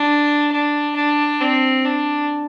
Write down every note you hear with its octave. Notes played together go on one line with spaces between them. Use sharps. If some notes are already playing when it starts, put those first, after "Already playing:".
Already playing: D4
D4
D4
C4
D4